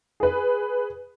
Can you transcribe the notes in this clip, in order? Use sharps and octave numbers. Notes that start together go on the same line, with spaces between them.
G#4 B4